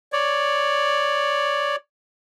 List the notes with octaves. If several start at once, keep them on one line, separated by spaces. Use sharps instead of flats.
C#5 D5